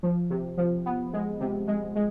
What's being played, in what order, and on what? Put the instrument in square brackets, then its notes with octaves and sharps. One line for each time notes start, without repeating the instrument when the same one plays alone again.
[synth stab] F3
C3
F3
B3
G#3
C3
G#3
G#3